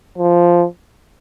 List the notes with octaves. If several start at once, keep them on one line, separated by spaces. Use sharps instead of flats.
F3